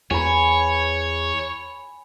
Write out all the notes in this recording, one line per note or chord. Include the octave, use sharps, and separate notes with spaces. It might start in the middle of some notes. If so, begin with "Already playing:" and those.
E2 C#5 G#5 B5